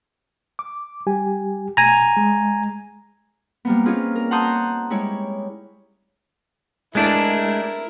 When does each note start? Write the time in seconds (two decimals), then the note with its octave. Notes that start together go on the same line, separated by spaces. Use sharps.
0.59 D6
1.07 G3 G4 G#5
1.77 B2 A3 G#5 A#5
2.17 G#3
3.65 G3 A#3 B3
3.86 C4 C#4 D#4 F4 G#4
4.15 A#4
4.31 F#5 A5 A#5 C6 D#6 G6
4.90 G3 G#3 E4 C#5
6.95 G#3 A3 D4 E4 A#4